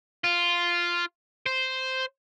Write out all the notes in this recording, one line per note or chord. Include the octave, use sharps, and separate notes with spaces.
F4
C5